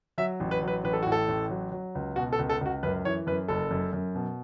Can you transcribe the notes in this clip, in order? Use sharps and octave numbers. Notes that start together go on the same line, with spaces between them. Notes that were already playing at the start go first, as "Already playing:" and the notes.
F#3 E5
A1
B4
F#3
B4
A1 B4
A4
A2 F#4
A4
A1
F#3
F#3
C#2
B2 F#4
A4
C#2
A4
C#2 F#4
F#2 B4
E3 C#5
F#2 B4
F#1 A4
F#2
F#2
B2